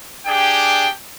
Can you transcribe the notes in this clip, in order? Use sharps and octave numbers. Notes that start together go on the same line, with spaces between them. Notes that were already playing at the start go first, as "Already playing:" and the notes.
D4 G4 G#4 G5